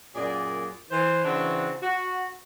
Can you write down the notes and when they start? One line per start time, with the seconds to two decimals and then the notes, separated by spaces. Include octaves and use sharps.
0.15 F#2 A#2 G#4 D5
0.91 E3 C5
1.24 C#3 E3 C4 D4 F#4
1.82 F#4